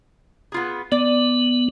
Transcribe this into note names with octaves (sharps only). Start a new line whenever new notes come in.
B3 F4 G#4
B3 D5